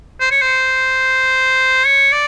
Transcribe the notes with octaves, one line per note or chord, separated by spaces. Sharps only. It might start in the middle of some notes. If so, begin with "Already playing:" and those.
C5
C#5
C5
C#5
D5